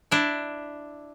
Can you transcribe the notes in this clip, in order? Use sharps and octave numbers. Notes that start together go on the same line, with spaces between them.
D4 E4